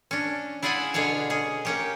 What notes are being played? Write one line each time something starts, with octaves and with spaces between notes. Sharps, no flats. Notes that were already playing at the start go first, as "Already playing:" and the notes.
C#4 D4
E4 F4 G#4 E5 F#5 G#5
B2 D3 G#4 C#5 F5
C#4 G#4
A#3 C#4 G4